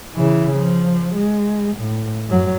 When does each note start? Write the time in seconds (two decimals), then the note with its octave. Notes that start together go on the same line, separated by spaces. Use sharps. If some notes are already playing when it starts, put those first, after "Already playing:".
0.15 C#3 E3
0.56 F3
1.15 G#3
1.76 A2
2.28 F#2 F#3